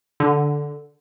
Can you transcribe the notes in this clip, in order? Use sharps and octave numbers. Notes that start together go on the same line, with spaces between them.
D3